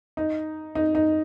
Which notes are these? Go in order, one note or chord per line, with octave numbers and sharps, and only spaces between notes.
D#4
D#4
D#4